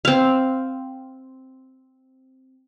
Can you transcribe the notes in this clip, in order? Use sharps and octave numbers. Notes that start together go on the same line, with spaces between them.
C4 F5